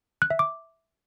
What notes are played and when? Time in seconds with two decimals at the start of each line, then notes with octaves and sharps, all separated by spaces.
0.22 F#6
0.30 E5
0.39 D6